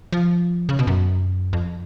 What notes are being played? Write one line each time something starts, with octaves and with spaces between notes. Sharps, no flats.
F3
C#3
B2
F#2
F2